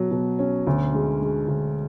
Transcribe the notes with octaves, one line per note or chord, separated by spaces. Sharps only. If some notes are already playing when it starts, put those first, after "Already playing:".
Already playing: B2 F#3
B2
C#4
D2
G#3
G#3
D2